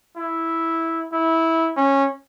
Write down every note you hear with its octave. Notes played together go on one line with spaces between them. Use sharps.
E4
E4
C#4